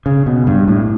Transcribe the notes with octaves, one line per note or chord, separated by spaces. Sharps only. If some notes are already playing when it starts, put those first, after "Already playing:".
C#3
B2
G2
A2